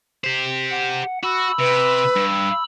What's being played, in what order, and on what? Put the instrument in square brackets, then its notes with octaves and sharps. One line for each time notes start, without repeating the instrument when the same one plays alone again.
[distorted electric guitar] G4 C5
[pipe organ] F#5
[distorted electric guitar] F#4 [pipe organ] B5 E6
[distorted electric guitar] C3 [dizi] B4
[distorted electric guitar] G2